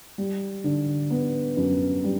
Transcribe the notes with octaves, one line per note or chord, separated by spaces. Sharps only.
G3
D3
B3
F#2
G3